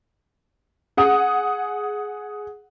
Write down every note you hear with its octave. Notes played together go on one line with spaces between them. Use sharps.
G#4 F#5 D#6